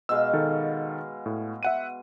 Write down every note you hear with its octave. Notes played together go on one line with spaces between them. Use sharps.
B2 G#3 F5 E6
D#3 A4
A2
E5 F#5 D#7